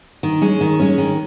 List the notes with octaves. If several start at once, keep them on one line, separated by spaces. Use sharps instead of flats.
D#3
G#3 C#4
D#3
G#3 C#4
D#3